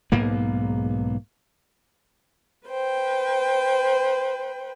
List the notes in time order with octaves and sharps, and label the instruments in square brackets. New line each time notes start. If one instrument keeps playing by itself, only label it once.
[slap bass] B1 G#2 A#3 B3
[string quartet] B4 C5 G5